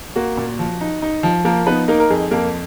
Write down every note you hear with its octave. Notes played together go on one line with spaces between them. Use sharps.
A#3 F#4
A#2
F3
D#4
D#4
F3
F3 A#3 A#4
B3 D#4 B4
A#3 D#4 A#4
A#4
F2 G#4
F2 A#3 A#4